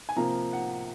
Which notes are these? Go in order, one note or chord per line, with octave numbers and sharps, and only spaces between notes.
G#5
C3 F3 A#3 A#5
F#5